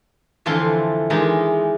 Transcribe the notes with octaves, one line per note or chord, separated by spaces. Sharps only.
F2 D3 E3 F5 A5 C6
D#3 E3 G#3 D4 D#4